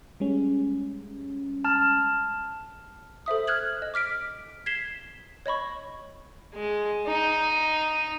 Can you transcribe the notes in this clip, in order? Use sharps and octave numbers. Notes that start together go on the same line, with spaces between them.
G3 G#3 C#4
A5 F6
A4 C5 E5 D#6
F6 F#6 G#6 F#7
D#5
D6 F6 B6 D7
G#6 B6 C7 E7 G7
C#5 D#5 B5 C#6
G#3
D#4